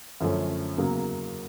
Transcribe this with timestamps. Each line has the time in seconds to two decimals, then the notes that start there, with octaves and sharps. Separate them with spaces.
0.20 F#2 D3 F3 A3 C#4
0.77 E2 C#3 F#3 A#3